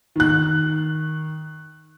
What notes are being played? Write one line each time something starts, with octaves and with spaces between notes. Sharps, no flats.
D#3 F#6